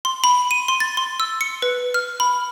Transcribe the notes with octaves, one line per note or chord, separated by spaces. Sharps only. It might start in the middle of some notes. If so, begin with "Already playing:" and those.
C6
B5
D#7
C6
A6
C6
E6
C#7
B4
F6
B5